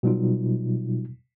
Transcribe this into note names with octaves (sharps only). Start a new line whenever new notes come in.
B2 F#3 G3 D#4 F4